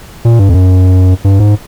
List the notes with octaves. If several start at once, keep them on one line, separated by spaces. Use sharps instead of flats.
A#2
G2
F2
F#2
G2
G#2